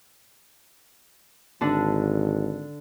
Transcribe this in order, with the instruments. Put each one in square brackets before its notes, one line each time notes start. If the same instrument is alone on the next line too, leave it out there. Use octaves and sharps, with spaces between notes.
[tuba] G#1 [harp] D3 D4